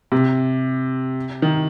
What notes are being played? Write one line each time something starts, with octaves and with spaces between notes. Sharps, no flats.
C3
D#3